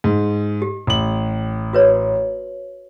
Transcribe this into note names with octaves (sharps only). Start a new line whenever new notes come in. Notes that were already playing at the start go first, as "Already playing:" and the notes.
G#2
G4
A1 F#7
F#4 B4 C#5